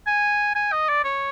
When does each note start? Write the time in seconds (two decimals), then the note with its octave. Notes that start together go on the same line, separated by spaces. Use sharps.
0.07 G#5
0.55 G#5
0.72 D#5
0.89 D5
1.04 C#5